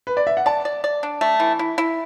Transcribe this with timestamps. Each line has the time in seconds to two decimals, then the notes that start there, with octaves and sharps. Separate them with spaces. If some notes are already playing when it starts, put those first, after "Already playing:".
0.07 B4
0.17 D5
0.27 E5
0.37 F#5
0.46 D5 A5
0.65 D5
0.84 D5
1.03 D4
1.21 A3
1.40 E3
1.59 E4
1.78 E4